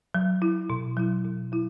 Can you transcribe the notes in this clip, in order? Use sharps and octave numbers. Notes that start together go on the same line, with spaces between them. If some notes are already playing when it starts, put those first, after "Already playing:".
F#3
E4
B2
F#3 E4
B2
F#3 E4